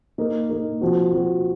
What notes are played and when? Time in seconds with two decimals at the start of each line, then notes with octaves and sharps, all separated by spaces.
0.18 A#3 D#4 A#4
0.50 A#3 D#4 A#4
0.81 F3 C4 F#4
1.13 F3 C4 F#4